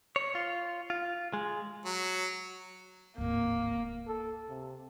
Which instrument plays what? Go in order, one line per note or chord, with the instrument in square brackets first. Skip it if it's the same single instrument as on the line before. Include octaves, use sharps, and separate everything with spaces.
[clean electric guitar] C#5
F4
F4
G#3
[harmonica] F#3
[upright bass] D1 G#1 [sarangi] A#3
[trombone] A4
C3